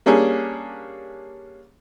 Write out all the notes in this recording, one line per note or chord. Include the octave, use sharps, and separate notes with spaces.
G3 A#3 C#4 D4 G#4